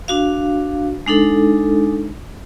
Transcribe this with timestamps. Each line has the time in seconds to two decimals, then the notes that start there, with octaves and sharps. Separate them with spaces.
0.08 D4 F#4 F5
1.06 G#3 D4 D#4 A4